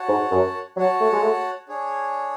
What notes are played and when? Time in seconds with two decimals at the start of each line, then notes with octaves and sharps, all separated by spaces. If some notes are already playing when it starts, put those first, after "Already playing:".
Already playing: F#4 C#5 F#5 A5
0.09 G#2
0.31 F#2
0.77 F#3 F#4 C#5 F#5 A5
1.00 A3
1.13 G#3
1.23 A3
1.69 D4 G#4 C#5